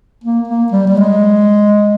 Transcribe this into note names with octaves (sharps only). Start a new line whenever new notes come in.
A#3
A#3
G3
G3
G#3